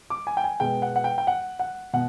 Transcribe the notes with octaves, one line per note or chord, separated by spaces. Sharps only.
D6
G#5
G5
G#5
B2 G#3 B3 G5
F#5
F#5
G5
G5
F#5
F#5
B2 F#5